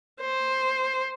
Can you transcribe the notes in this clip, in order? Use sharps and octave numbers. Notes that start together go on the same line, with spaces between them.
C5